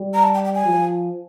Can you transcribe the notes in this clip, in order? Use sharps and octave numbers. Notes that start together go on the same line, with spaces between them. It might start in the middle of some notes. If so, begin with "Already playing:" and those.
Already playing: G3
A#5
A5
G5
G5
G#5
F3